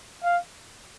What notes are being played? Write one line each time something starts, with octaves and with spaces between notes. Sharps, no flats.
F5